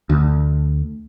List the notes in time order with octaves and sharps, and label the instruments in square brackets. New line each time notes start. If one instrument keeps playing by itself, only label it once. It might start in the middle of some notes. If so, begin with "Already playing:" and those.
[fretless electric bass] D2